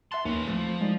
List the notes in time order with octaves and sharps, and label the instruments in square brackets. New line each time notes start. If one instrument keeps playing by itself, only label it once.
[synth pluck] E5 F#5 A5 [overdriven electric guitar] C6
[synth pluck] D#2 [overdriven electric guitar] C#4 B4
[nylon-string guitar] E3 A3 C4 [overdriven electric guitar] F3
[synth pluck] G#3 [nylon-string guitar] D#4 D5